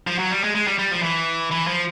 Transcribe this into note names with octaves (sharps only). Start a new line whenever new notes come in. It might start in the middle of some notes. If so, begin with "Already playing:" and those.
F3
F#3
G3
G#3
G#3
G3
G3
F3
E3
E3
F3